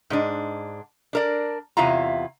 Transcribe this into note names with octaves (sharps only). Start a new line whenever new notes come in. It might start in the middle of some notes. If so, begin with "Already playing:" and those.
G#2 G#3 D4
D4 A#4 D5
E2 C3 E4 F4 A#5